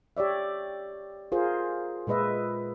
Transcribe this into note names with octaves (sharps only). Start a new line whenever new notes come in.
G4 C#5 D5 E5
F4 G#4 A#4 C5
A#2 G#3 B4 D#5 E5